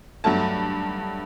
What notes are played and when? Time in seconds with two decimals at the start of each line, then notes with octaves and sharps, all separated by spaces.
0.24 G2 F#3 A3 A5